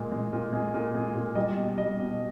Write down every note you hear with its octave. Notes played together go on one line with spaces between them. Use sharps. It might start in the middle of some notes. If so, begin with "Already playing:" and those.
Already playing: A#2 G#3
G#3
A#2
G#3
A#2
G#3
A#2
G3 D#5
B2
G3 D#5
B2